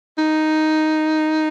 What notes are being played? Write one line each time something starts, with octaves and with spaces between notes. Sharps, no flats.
D#4